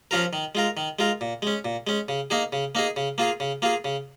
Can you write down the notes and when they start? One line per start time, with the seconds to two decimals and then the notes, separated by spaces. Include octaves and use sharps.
0.11 F3 C#4 F4 A#4
0.33 D#3
0.55 G#3 F4 A#4
0.77 D#3
0.99 G#3 F4 A#4
1.21 A#2
1.42 G#3 C#4
1.65 A#2
1.87 G#3 C#4
2.08 C#3
2.30 A#3 D#4 G#4
2.53 C#3
2.75 A#3 D#4 G#4
2.96 C#3
3.18 A#3 F4 G#4
3.40 C#3
3.62 A#3 F4 G#4
3.85 C#3